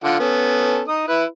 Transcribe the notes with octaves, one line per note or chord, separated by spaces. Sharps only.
D3 F4 F#5
B3 C#4 A4
D#4 D#6
E4 B4